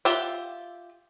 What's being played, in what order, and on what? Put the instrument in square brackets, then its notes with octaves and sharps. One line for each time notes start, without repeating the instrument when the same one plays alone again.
[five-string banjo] F4 G4 E5 F#5 G5